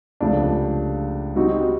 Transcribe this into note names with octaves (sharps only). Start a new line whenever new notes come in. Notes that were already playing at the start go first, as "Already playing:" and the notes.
C#2 C3 F3 A3 D4
G3 C4 D#4 F#4